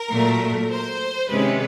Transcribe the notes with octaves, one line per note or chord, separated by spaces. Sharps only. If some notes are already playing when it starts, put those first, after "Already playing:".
Already playing: A#4
A#2 F#3 A3
C5
C3 D#3 G#3 C#4 B4